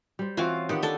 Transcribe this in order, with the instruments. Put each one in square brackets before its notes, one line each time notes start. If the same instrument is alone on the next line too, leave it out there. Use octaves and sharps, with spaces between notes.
[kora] G3 C5
[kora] E3 C4 C#4 [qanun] F4 F#4 F5
[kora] D#3 B3 F#5 [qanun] G4
[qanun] D4 A4